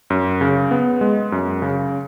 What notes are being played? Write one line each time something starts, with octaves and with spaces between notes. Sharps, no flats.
F#2
C#3
B3
G#3
F#2
C#3